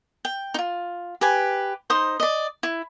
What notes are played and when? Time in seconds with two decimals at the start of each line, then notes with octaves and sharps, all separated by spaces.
0.25 G5
0.54 D#4 F4
1.21 G4 B4 G#5
1.90 D#4 C5 C6 D#6
2.20 D5 D#5
2.63 E4